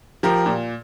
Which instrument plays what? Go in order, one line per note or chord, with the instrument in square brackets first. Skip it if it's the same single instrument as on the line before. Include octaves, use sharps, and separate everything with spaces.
[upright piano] F3 G4 A#4
A#2